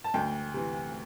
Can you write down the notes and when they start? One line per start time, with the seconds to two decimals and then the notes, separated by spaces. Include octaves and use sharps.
0.04 A5
0.14 D2 G5
0.54 C3 E3